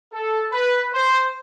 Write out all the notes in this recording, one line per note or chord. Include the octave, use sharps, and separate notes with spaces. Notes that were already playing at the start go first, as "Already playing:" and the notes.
A4
B4
C5